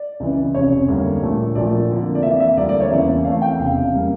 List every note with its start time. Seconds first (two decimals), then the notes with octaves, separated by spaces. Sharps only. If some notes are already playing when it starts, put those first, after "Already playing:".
Already playing: D5
0.20 C#2 C#3 E3
0.55 F1 F2 C#3 C#5
0.88 D2 D3 G3 A#3
1.21 A#1 A#2 A3
1.55 A#1 A#2 F3 A3 D5
1.90 F2 D3 F3 A#3
2.15 D5
2.23 F2 E3 A#3 E5
2.40 E5
2.57 D2 D3 G3 A#3 D5
2.69 D5
2.80 C#5
2.90 E2 C#3 E3 A#3 E5
3.25 F2 E3 A3 F5
3.35 F5
3.42 G5
3.59 F1 E2 C#3 F5
3.93 C#3 G3 A#3